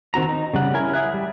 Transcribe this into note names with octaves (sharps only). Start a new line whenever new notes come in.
D#3 C4 F#4 A#5
D#4
C#3 G3 F#5
C#4 E4 A#4 G#5
G#4 E5 F#6
G3